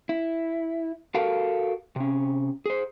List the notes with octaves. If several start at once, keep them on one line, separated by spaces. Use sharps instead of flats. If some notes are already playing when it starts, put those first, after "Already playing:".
E4
F#4 G4 A4 A#4 F5
C3 C#4
G#4 C5